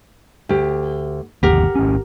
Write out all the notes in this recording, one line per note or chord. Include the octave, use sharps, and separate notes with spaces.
D2 G4
G1 D#2 G4 A#4 F#5
G#1 C#4